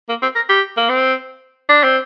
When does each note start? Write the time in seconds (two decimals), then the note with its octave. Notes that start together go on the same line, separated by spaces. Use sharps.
0.09 A#3
0.22 C4
0.35 A#4
0.49 G4
0.77 A#3
0.89 C4
1.69 D4
1.84 C4